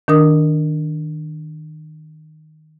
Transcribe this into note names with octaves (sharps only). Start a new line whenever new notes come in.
D#3 D4 A#4 D#6